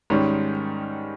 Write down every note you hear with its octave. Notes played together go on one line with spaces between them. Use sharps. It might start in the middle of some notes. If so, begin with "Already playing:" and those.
G#2 D#3 G3 C#4